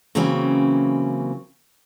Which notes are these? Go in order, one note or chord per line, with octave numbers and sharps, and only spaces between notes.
C#3 E3 F#3 A#3 C4 C#4